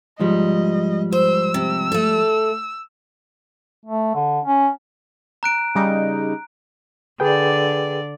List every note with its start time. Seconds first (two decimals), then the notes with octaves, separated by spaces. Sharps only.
0.20 G#2 F3 G3 D#5
1.12 C5 E6
1.54 C3
1.92 A3 A4
3.86 A3
4.15 D3
4.45 C#4
5.43 A#5 F#6 D7
5.75 C#3 G3 D#4
7.20 D3 G#4 B4 D5 G5